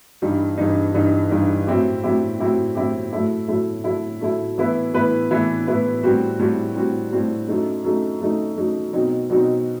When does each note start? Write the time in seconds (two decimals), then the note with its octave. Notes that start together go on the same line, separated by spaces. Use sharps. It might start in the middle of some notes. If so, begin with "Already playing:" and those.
0.22 G2 E3 G3 D#4
0.58 G2 E3 G3 D#4
0.94 G2 E3 G3 D#4
1.30 G2 E3 G3 D#4
1.67 A2 F#3 C4 E4 G4
2.03 A2 F#3 C4 E4 G4
2.40 A2 F#3 C4 E4 G4
2.75 A2 F#3 C4 E4 G4
3.13 A2 F#3 A3 E4
3.48 A2 F#3 A3 E4
3.84 A2 F#3 A3 E4
4.21 A2 F#3 A3 E4
4.58 A2 E3 B3 E4 B4
4.93 A2 E3 B3 E4 B4
5.31 A2 E3 B3 E4 B4
5.67 A2 E3 B3 E4 B4
6.03 A2 G3 C4 F#4
6.39 A2 G3 C4 F#4
6.75 A2 G3 C4 F#4
7.11 A2 G3 C4 F#4
7.48 F#2 F#3 A3 D#4
7.84 F#2 F#3 A3 D#4
8.21 F#2 F#3 A3 D#4
8.57 F#2 F#3 A3 D#4
8.93 B2 F#3 C4 D#4
9.30 B2 F#3 C4 D#4